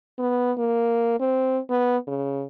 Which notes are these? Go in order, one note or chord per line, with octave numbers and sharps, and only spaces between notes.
B3
A#3
C4
B3
C#3